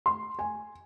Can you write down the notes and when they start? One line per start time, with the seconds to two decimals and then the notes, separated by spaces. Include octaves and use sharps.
0.06 C6
0.39 G#5